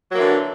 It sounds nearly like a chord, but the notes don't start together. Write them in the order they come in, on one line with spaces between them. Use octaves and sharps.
F#3 A#3 E3 D3